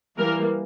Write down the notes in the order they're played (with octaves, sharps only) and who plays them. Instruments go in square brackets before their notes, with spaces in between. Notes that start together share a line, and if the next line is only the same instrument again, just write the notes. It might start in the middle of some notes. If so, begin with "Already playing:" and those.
[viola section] E3 G3 A#3 A#4